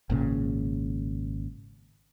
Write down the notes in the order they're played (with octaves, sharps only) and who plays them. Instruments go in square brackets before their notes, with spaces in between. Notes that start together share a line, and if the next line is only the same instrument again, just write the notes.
[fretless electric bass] G#1 A#2 C#3